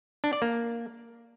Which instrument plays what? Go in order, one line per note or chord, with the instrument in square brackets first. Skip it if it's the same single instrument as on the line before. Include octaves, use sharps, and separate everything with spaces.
[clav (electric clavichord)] D4
D5
A#3